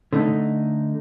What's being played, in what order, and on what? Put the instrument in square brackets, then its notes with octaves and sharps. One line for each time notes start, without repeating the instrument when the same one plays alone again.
[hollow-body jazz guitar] D3 A3 D#4